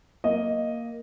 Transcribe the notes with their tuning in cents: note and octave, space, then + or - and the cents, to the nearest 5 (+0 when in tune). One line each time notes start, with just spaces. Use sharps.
A#3 +0 D#5 +0